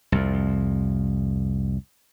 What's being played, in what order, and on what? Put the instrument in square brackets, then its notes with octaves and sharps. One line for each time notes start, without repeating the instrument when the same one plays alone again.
[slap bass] C2 F2